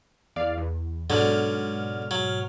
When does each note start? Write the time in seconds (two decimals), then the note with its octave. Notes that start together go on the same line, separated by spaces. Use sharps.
0.36 E2 D5 F5
0.58 E2
1.10 G#2 B2 D3 F#3 F6
2.11 F#3